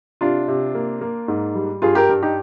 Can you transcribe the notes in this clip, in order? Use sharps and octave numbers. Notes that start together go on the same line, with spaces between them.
C3 D4 F4
C3
A#3
A#3
G#2
G3
G2 F4 G#4
G4 A#4
G2
D#4 G4